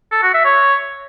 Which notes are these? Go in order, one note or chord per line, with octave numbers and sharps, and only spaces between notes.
A4
F#4
E5
C#5